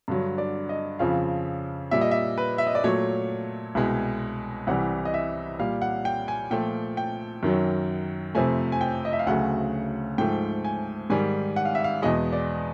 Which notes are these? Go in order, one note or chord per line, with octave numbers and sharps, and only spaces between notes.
G2 D3 F#3
D5
D#5
F2 C#3 F3 F5
A#2 G3 E5
D#5
E5
B4
E5
D#5
D5
A#2 F#3 A3 C#5
C2 B2 G#3
C2 C3 E3 G3 F#5
D#5
E5
A#2 G3 F5
F#5
G5
G#5
A#2 F3 A3 G5
G5
F#2 D#3 F#3
F2 C3 F3 A3 G#5
G#5
G5
D#5
E5
F5
D2 C#3 F#3 A3 F#5
G#2 F3 A3 G5
G#5
G#2 D#3 G3 G#5
F#5
F5
E5
F5
E2 B2 G#3 D#5
D5